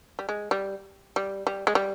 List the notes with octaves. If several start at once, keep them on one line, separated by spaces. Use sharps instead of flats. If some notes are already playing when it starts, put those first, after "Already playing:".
G3
G#3
G3
G3
G3
G#3
G3